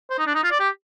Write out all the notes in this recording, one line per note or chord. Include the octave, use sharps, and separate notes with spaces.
C5
D#4
D4
D#4
F4
D5
G4